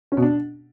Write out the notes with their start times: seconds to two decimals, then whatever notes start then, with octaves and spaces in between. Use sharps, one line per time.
0.12 C#4
0.17 B2
0.22 D4